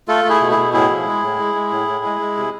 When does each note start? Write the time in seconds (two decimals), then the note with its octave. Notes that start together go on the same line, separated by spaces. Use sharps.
0.08 A3 F4 A4
0.25 A3 E4 G#4
0.41 B2
0.51 E4 G#4
0.57 B2
0.73 A2 E4 G#4
0.90 F3
1.06 G#3
1.22 A2
1.39 G#3
1.55 G#3
1.71 A2
1.88 A2
2.05 G#3
2.20 G#3
2.37 C3